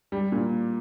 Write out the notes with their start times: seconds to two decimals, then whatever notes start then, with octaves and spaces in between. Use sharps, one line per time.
0.12 G3
0.32 A#2